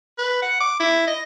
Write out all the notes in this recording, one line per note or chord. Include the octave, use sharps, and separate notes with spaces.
B4
F#5
D6
E4
D#5